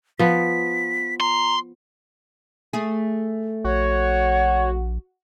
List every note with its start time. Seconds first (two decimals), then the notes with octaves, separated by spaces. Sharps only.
0.19 F3 B3 B6
1.20 A#5 C6
2.73 A3 G#4
3.64 A#1 F#4 C#5